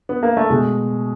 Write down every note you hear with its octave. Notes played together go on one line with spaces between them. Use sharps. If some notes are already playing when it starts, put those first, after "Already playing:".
B3
A#3
A3
B2 G#3